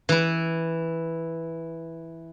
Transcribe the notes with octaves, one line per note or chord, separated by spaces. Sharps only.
E3 E4